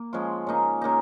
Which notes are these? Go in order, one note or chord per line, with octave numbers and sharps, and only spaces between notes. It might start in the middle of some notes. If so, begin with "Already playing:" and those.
Already playing: A#3
F3 G#3 C#4 F4
C#3 A#3 D#4
C#3 A#3 D#4